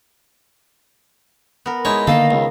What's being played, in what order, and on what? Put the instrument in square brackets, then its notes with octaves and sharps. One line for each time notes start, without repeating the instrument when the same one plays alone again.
[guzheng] B3 A#4
[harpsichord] G#3 C#5 [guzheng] D#4 E4
[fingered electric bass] D3 A#3 [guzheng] D#3 D#5 A5 [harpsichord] A4 [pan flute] F5
[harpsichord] C#2